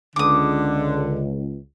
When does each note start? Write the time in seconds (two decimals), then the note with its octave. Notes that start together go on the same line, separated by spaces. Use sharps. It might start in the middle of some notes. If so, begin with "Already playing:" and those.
0.16 C#2 D3 D6 D#6